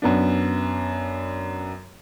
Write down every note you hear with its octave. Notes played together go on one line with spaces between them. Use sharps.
F#2 B3 D4